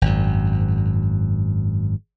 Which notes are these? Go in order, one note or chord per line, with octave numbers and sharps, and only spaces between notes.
G#1 F#2